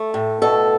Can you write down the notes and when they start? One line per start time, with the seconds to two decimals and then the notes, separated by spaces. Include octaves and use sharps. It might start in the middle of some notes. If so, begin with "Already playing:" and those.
Already playing: A3
0.14 A2
0.42 B2 A4